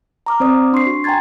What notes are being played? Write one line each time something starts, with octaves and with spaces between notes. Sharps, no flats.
A#5 D6 F6
C4 C5 D5 D#6
D4 C6 C#6 C7
F#4
G5 G#5 A#5 C6 G#6 A6